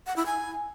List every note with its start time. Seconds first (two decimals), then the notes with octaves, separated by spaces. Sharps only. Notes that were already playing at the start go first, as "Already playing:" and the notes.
0.07 F#5
0.16 E4
0.26 G#5